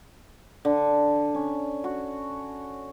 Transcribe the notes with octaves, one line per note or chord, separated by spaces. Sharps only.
D3
C#4
F#4